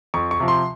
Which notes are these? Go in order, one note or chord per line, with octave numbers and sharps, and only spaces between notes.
F2 C#6
C#6
C3 F3
C6